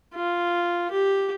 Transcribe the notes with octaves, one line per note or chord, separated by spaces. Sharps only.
F4
G4